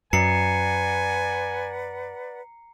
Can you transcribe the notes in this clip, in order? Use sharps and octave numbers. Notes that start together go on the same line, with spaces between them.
F#2 B4 D5 F#5 G#5 A#5 C7 C#7